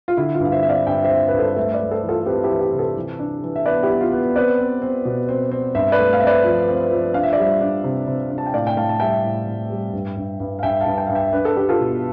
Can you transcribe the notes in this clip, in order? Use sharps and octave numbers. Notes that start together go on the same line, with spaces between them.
F4
D3 E4
F4
G2 F5
C5 E5
C4 E5
D5 F5
G2 E5 G5
C5 E5
C4
B4
G2
A4 C5
A3 C5 E5
B4 D5
A3
A4 C5
E3
F4 A4
C4 G4 B4
E4 G4
E3
E4 G4
C3
A4 C5
E3
D4
E3
E5
B3 B4 D5
E4 G4
B3
F4
B3
C4 B4 D5
C4
C4
B2
C4
C4
G2 C5 E5
B4 D5
A3
F5
C4 E5
B4 D5
F3
C4
F3
D4 F5
E5
D5
G3 C5 E5
D4
C3
C3
D4
A5
G5
A2 D5 F5
G5
A2 F5 A5
A5
G3 E5 G5
A2
A2
G3
G2
G2
G2
F5
G2 E5 G5
F5 A5
G2
E5 G5
G2 F5
E5 G5
D4 B4
A4
D4 G4
F4 A4
B2